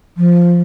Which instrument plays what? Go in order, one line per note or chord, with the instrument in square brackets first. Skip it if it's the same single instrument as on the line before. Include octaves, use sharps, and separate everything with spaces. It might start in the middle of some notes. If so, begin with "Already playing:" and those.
[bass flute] F3